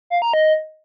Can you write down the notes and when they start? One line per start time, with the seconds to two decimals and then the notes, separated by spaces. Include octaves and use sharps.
0.10 F5
0.22 A#5
0.34 D#5